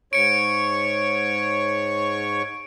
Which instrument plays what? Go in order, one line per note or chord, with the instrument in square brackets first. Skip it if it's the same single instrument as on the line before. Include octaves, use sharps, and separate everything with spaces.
[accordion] G#2 C#5 C#6 [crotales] C#7 D7